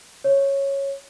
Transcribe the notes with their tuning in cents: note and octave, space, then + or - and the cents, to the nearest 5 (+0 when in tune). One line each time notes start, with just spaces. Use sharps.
C#5 -5